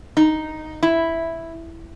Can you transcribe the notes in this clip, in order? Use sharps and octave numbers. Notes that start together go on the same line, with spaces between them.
D#4
E4